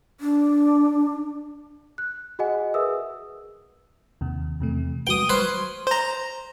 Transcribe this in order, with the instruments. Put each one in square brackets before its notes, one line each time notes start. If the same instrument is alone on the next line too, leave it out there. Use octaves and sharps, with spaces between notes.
[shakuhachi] D4
[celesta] F#6
F#4 G#4 D#5 F#5 G#5
G#4 A#4 B4 E5 D#6 E6
[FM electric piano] D#2 C3
E2 C3 A3
[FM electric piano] F#4 B4 [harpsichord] G5 D#6
[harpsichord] B4 C5 [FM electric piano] C#6 F6 G#6
[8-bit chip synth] C5 A#5